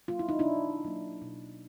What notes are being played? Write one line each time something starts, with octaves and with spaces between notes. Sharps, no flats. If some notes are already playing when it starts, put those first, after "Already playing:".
F#3 A#3 F4
E4
D#4
D4 E4
B2
F#3 A#3
B2